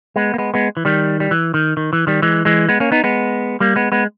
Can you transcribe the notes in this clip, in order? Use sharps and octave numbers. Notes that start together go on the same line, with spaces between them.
G#3 B3
A#3
G#3 B3
G#3 B3
E3
D#3 G3
G3
E3
D#3
D#3
E3
D#3 G3
E3 G#3
E3 G#3
G#3 B3
A#3 C#4
B3 D#4
G#3 B3
G3 A#3
G#3 B3
G#3 B3